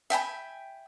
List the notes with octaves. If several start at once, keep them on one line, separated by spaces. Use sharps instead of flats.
E5 G5 G#5 B5